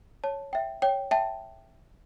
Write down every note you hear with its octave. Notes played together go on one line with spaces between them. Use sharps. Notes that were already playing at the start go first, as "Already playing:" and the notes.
C#5 A5
E5 G5
C#5 G5
E5 G5 A5